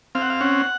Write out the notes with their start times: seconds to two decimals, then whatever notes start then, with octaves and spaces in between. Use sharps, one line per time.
0.15 C4 F5
0.22 F#5
0.30 F5
0.41 C#4 F#5